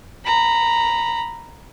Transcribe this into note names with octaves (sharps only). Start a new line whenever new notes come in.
A#5 B5